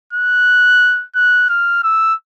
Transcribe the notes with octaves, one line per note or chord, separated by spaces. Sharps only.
F#6
F#6
F6
E6